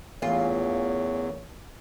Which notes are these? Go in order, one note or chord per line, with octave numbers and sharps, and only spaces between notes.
A1 E2 A#2 F4 C#5